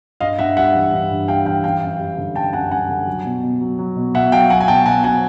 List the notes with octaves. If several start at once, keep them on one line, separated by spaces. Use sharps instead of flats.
G2 D#5 F5
G2 E5 F#5
G3 E5 F#5
E3
G2
G2
G3 F5 G5
E3 F5 G5
F#2 F5 G5
F#2
G3
D3
F#2 G5 A5
F#2 F#5 G#5
G3 F#5 G#5
D3
F#3
B2
B2
F#3
F#3
B2
B2 E5 F#5
F#3 F5 G5
F#3 F#5 G#5
G#5
B2 G5 A5
B2 F#5 G#5
F#3 F#5 G#5